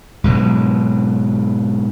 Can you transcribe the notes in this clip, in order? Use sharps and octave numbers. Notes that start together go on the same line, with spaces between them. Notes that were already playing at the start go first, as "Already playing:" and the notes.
G#2 B2 F#3